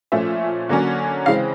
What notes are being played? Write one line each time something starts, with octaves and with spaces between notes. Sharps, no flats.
A#2 F3 A3 C#4 E5
D3 F#3 A#3 C#4
C#3 E3 G#3 C4 F5